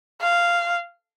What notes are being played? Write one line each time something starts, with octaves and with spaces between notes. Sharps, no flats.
F5